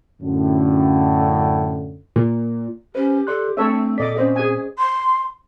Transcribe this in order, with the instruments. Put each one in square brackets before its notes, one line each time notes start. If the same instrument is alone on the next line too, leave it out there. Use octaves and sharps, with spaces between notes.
[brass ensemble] F#2 A2 D3
[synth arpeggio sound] A#2
[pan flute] C#4 [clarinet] G4 [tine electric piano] B4 C5
[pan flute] A4 [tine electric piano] D5 C6 F#6
[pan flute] A3 [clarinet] C4 [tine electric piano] D4 [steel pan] A4 C#5 E5
[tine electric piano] A#2 B6 [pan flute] A4 [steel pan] D5 D#5 D6
[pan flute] C4 [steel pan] C#4 C5 D#5
[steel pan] G#4 G#5 [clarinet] D#6
[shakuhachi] C6